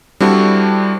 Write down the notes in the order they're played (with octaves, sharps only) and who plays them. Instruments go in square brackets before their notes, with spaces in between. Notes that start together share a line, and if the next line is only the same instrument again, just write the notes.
[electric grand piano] G3 C4 D4 E4 F#4 A4